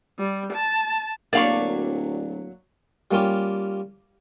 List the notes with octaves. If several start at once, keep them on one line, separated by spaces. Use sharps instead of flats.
G3
A5
D1 F#3 A#3 D4 D5 F5 C#6
G3 A#3 C#4 F4 G4